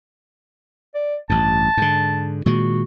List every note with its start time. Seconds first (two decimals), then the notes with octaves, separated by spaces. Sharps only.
0.94 D5
1.30 A1 G2 A5
1.77 G#2 D3
2.46 A#2 D#3 G#3 F#4